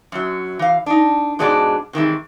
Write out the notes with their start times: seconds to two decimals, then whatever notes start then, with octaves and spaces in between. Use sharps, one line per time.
0.12 F#2 F#3
0.59 E3 F5
0.86 D4 D#4
1.39 G#2 B2 G#3 D4 A4 D5
1.93 C3 D#3 E3 G#3